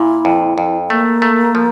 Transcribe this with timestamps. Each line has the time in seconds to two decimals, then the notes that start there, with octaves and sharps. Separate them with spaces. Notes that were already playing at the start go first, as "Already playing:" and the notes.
Already playing: A#2 E4
0.25 F2
0.58 F2
0.90 A3 A#3
1.22 A3
1.55 F3